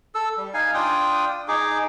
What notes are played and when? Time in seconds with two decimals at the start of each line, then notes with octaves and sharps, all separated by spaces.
0.15 A4 E6
0.38 G3
0.54 D#4 F5 G#5
0.74 D4 F4 G5 D#6
1.48 D#4 G#4 D6